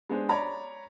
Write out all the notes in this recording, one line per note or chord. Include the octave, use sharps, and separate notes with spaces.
G#3 B3 D4 G#4 C5
C#5 D5 A#5 B5